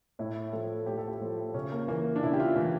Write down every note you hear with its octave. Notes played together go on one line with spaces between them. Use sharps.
A2 E4
F3 A4
A2 G4
A4
G4
F3
C#3 C#4
A#3
E3 A#3
D4
C#3 E4
G4
F4
E3